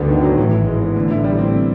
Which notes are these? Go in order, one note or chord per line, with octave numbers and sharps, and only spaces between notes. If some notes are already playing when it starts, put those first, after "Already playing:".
Already playing: D2 G2 D3 B3
D#3
F#3
A1 A2 E3
E4
G#1 G#2 G#3
B3
A1 A2 D3
E4
G3
C4